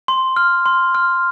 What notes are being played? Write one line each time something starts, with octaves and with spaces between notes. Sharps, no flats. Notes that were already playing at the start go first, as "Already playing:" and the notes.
C6
F6
C6
F6